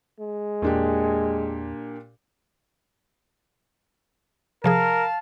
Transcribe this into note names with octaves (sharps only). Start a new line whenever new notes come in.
G#3
E2 A#2 D4 G4
C3 F3 G#4 A#4 F5 A5